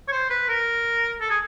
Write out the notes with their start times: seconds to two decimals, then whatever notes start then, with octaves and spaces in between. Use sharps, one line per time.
0.08 C#5
0.12 C5
0.30 B4
0.49 A#4
1.21 A4
1.30 G#4